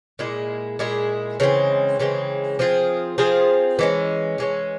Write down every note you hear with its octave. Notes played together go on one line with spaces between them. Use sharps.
A#2 G#3 E4 G#4
A#2 G#3 E4 G#4
C#3 E3 G#3 C4
C#3 E3 G#3 C4
F3 C4 F4 G#4
F3 C4 F4 G#4
E3 G#3 C#4
E3 G#3 C#4